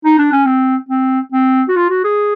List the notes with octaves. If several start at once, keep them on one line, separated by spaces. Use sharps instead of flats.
D#4
D4
C#4
C4
C4
C4
F#4
F4
F#4
G#4